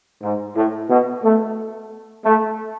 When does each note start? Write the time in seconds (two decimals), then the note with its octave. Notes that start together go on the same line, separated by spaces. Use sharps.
0.23 G#2
0.56 A2
0.89 B2
1.24 A3
2.25 A3